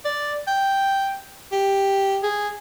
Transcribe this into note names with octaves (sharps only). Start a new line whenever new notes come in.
D5
G5
G4
G#4